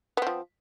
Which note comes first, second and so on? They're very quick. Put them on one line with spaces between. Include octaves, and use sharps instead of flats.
B3 C4 F3